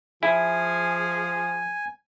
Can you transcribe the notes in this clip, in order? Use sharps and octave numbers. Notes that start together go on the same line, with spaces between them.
F3 E4 G#4 G#5